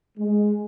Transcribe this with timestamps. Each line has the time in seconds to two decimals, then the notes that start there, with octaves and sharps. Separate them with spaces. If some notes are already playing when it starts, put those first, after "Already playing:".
0.18 G#3